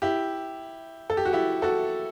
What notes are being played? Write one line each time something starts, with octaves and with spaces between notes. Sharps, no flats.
E4 G4
A4
G4
F#4
E4 G4
F#4 A4